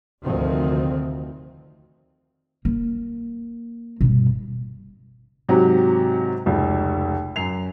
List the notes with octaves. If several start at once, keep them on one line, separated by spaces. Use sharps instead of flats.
F1 D2 D#3 F3 C4
A#3
G2 B2
G#2 C3 F#3 F#4 G4
F1 C#2
F#2 C7 F7